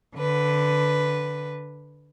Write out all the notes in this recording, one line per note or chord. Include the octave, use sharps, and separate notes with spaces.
D3 B4